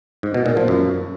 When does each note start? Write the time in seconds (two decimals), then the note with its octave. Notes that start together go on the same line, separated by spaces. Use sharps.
0.23 G#2
0.34 B2
0.46 A#2
0.57 F3
0.68 F#2